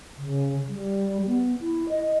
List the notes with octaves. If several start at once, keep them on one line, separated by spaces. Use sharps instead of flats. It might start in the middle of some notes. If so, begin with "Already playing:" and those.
C#3
G3
B3
E4
D#5